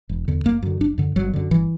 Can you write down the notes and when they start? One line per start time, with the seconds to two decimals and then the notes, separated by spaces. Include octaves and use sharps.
0.09 E1
0.28 E2 D3
0.45 F#1 A#3
0.62 F#2 D3
0.80 F#1 D4
0.98 F#2 D3
1.16 G1 F#3
1.33 F#2 D3
1.51 G1 E3